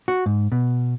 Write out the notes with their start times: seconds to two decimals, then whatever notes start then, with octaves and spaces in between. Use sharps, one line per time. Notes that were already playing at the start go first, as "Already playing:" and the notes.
0.08 F#4
0.26 G#2
0.52 B2